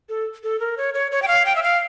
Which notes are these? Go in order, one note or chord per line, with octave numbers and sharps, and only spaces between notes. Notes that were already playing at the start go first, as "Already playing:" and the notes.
A4
A4
A#4
C#5
C#5
C#5
G5
F5
G5
E5
F5